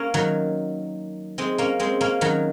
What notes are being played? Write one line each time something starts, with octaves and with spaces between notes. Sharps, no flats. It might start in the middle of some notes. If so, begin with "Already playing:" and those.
Already playing: A#3 C#4
D#3 F#3
G#3 C4
A#3 C#4
G#3 C4
A#3 C#4
D#3 F#3